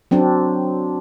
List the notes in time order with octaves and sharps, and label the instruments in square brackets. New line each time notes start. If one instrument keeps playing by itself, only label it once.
[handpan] F#3 C4 D4